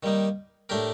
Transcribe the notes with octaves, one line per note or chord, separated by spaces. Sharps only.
D#3 G3 A#3 D#4
A2 A3 D4 G4 A#4